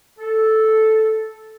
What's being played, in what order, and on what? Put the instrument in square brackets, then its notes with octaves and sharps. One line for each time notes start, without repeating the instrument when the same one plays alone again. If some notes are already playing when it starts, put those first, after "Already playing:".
[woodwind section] A4